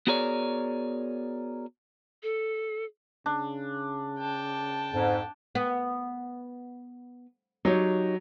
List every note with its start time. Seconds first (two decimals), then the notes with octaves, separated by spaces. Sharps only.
0.07 B3 F#4 G#4 A#4 C#5 D5
2.23 A4
3.26 C#3 D4
4.20 G5 A5
4.93 F2 G#2
5.55 B3
7.65 F#3 D#4 G4 C#5